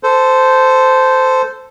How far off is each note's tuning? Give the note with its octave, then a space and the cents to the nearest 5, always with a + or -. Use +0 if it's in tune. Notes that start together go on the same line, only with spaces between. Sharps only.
A4 +0 C5 -15